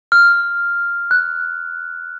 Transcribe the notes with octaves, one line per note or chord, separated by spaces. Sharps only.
F6
F#6